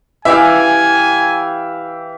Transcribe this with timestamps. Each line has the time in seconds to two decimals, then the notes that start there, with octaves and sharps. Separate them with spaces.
0.25 E3 G4 E5 F5 G#5